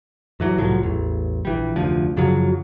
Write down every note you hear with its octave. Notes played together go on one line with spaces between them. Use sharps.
G2 E3 F#3
C2 A2 F3 F#3
A1 E2
A#1 E3 G3
F1 D2 F3
F#2 C#3 F3 F#3